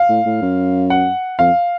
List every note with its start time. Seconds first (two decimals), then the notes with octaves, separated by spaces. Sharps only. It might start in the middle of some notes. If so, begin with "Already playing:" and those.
Already playing: F5
0.09 A2
0.26 A2
0.42 F#2
0.90 F#5
1.39 F2 F5